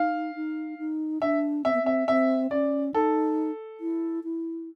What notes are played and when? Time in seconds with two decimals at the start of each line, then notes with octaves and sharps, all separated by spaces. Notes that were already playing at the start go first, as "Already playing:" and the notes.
Already playing: D#4 F5
0.35 D#4
0.78 D#4
1.22 D4 E5
1.65 C4 E5
1.74 B3
1.83 C4 E5
2.08 C4 E5
2.51 C#4 D5
2.94 D#4 A4
3.80 E4
4.24 E4